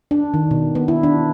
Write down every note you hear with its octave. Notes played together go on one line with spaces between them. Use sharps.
D4
D#3
B2
B3
E4
D4